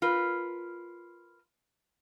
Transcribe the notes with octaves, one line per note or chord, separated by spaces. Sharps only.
F4 A#4 B4